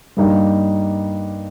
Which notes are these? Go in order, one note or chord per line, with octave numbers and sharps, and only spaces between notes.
G2 G3 A#3 D#4